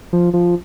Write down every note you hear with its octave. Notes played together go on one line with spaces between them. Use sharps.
F3
F3